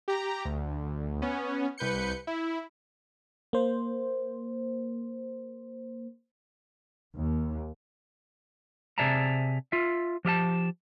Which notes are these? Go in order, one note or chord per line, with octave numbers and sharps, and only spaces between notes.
G4 A#5
D2
B3 C#4
C2 B4 G6 C#7
E4
A#3 C5
D#2
C3 G#4 D5 E5 A5 A#5
F4 E5
F3 G4 E5 A5